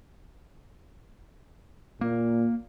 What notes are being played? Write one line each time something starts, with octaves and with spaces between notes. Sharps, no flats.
A#2 A#3